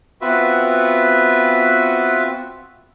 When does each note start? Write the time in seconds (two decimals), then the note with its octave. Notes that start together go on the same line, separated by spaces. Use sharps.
0.21 B3 C4 F4 F#4 B4 E5